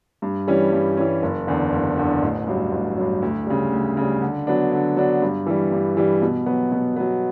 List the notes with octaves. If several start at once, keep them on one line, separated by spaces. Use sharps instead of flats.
G2
E3 G3 C#4
G2
E3 G3 C#4
F#1
E2 D3
F#1
E2 D3
A1
G2 F#3
A1
G2 F#3
D2
C#3 G3
D2
C#3 G3
D3
F#3 B3 D4
D3
F#3 B3 D4
G2
E3 G3
G2
E3 G3
B2
F#3 B3
B2
F#3 B3